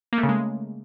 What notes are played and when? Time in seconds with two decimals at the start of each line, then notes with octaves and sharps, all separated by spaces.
0.13 A#3
0.18 A3
0.23 C#3
0.29 G#3